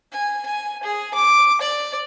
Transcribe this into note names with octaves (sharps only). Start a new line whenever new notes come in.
G#5
G#5
G#4
D6
D5